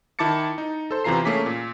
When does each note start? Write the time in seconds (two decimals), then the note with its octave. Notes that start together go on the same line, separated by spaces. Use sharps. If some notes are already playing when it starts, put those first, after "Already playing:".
0.19 D#3 E4 A5 D6 A6 C#7
0.58 D#4
0.91 A4 C5
1.04 E2 C3 E3 F4 A#5 C7
1.25 A3 A#3 C#4 G#4 D6 B6
1.46 A#2